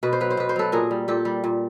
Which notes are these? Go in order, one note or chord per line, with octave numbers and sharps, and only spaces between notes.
B2 B4
C5
F#3 B4
C5
B2 B4
C5
F#3 A4 B4
A#2 G#4 A#4
G3
A#2 G4 A4
G3
A#2